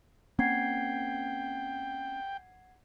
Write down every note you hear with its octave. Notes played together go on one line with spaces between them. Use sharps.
A#3 C4 C#4 F#5 G5 G#6 C7